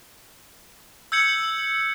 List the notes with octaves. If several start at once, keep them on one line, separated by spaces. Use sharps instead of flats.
E6 G6 G#6 C#7 F#7